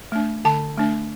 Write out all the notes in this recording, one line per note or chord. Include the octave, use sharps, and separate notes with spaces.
A3 D4
D3 A5
A3 D4